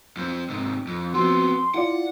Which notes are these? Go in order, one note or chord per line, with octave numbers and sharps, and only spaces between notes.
F2 C4
G#2 C3
F2
F3 B3 C4 F#4 C6
E4 F4 D5 F#5